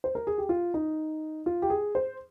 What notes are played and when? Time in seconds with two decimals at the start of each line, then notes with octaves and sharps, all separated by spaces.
0.04 C5
0.15 A#4
0.27 G#4
0.38 G4
0.49 F4
0.74 D#4
1.46 F4
1.62 G4
1.70 G#4
1.95 C5